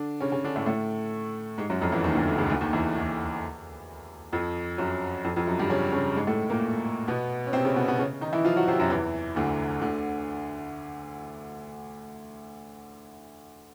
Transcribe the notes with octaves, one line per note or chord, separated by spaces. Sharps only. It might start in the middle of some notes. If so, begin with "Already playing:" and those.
Already playing: D3 D4
C#3 C#4
C#3 C#4
D3 D4
A2 A3
A2 A3
G#2 G#3
F#2 F#3
F2 F3
E2 E3
D#2 D#3
D2 D3
C#2 C#3
D2 D3
D#2 D#3
E2 E3
D#2 D#3
F2 F3
F#2 F#3
F2 F3
F2 F3
F#2 F#3
G2 G3
C#3 C#4
C#3 C#4
G#2 G#3
A2 A3
A#2 A#3
B2 B3
C#4
C3 C4
C#3 C#4
B2 B3
B2 B3
C#3 C#4
D#3 D#4
E3 E4
F3 F4
F#3 F#4
C3 C4
F#2 F#3
E2 E3
D2 D3
D2 D3